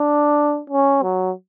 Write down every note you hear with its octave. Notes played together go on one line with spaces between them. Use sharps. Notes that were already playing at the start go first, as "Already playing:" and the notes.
Already playing: D4
C#4
F#3